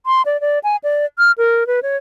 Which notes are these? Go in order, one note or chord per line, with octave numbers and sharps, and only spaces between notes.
C6
D5
D5
G#5
D5
F6
A#4
B4
C#5